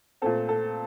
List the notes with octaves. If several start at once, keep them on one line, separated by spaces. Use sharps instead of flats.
A#2 A3 C4 A4
A4